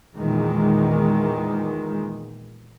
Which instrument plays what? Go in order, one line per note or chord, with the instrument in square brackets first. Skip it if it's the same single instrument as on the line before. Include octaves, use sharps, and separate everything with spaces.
[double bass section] E2 A#2 D#3 G#3